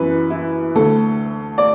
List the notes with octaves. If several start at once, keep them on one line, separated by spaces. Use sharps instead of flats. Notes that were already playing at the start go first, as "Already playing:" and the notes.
Already playing: F#2 E3 B4
E4
D2 D3 A4
D5